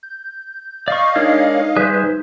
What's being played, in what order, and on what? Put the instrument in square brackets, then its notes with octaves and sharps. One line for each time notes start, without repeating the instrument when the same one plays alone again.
[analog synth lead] G6
[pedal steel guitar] D5 C#6 [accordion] D#5 F5
[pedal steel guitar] G#3 D4 [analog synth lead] D#4 [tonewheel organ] A#4 C#5
[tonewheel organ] G3 B4 E5 [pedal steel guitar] G#4 C5